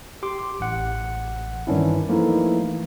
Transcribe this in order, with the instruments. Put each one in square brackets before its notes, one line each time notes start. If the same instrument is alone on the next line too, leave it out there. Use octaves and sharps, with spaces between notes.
[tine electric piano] G4 C6 D6
A1 F#5
G2 D#3 E3 C#4 D4 E4
E3 F3 A3 A#3 D#4 E4